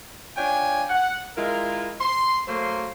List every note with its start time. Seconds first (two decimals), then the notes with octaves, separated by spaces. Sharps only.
0.37 D4 F4 C#5 G5 G#5
0.89 F#5
1.37 G#3 E4 F4 A#4
2.00 C6
2.47 F#3 A3 A#3 C5 C6